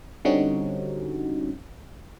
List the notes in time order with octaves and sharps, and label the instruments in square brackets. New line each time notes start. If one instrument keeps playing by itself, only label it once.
[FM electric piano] D3 G3 C4 C#4 D#4 F#4